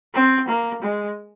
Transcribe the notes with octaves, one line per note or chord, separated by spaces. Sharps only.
C4
A#3
G#3